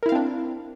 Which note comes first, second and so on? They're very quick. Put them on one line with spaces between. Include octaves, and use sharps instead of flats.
A#4 E4 F5 C4 D4